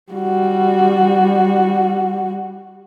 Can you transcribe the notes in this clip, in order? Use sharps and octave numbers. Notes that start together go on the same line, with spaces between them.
G3 F#4